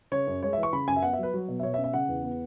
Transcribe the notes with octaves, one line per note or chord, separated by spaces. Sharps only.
C#3 C#5
F#2
G#3 C#5
E5
E3
C#6
C#3 B5
F#2 G#5
E5
B3 F#5
E5
F#3 B4
F#3
B2
E5
B2 C#5
E5
C#4
E5
C#3 F#5
E2
B3